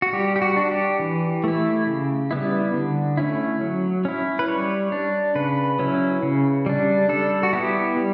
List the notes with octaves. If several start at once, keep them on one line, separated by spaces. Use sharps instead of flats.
F#4
G3 G4
G4
F#4
D4
G4
E3
A3 E4
C#3
G3 B3 E4
D3
A3 C#4 E4
F#3
C#4 E4
B4
G3 C#5
D4
C#3 B4
F#3 C#4 E4
C#3
G3 D4
G3 A4
F#4
B3 E4 G4
G3